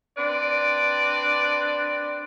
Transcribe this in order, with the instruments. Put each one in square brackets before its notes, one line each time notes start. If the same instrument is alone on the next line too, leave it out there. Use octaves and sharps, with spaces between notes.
[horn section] C4 D4 B4 D5